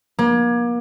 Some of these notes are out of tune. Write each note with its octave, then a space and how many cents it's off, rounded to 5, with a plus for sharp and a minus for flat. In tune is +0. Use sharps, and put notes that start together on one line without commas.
A#3 +35